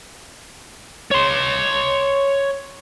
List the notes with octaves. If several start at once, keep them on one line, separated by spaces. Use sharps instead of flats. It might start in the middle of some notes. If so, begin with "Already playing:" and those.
C#5 C6